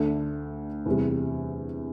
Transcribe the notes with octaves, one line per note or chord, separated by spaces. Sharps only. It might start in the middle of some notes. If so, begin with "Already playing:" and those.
Already playing: D2 D3 A3 D4
E2 C3 G3